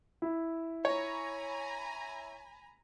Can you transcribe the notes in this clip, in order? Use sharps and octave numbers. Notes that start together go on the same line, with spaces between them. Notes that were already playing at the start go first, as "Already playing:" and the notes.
E4
C#5 G#5 A#5 B5